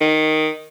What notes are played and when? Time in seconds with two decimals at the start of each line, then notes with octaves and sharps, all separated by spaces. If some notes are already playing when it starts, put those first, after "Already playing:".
0.01 D#3